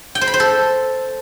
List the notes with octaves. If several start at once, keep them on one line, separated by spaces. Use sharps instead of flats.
G5
C5
B5
C5
A4